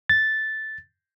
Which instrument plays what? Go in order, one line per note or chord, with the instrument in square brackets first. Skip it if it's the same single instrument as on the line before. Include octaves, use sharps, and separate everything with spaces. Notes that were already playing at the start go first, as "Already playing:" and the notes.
[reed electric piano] A6